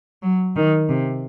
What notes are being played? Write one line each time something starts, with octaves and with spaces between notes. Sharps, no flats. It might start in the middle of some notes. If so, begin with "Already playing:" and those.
F#3
D#3
C3